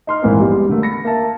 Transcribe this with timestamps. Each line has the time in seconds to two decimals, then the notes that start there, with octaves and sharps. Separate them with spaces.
0.07 D#4 C6 F6
0.22 A#1 G#2 E3 A#3 C4 B4
0.40 G3 G#3 B3
0.69 D3 A3 A#3
0.82 B5 A#6 C#7
1.05 A#3 E5 A5